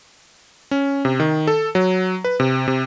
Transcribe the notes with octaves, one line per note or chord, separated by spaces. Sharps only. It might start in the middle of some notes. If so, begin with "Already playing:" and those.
C#4
C3
D#3
A4
F#3
B4
C3
C3